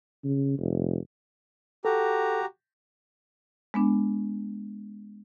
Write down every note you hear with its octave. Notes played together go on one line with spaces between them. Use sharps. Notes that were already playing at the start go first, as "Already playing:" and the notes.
C#3
F1
F#4 G4 A4 A#5
G#3 B3 D4